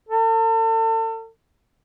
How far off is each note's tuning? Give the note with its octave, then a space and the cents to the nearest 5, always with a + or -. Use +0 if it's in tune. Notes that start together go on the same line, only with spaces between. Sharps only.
A4 +40